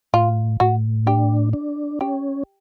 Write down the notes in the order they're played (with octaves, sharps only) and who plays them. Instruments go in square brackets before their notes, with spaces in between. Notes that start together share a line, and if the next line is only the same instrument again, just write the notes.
[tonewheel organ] A2 [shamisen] F4
[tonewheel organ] A2 [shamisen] F#4
[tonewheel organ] D4 [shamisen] G4
[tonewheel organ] D4
[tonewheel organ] C#4 [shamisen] G4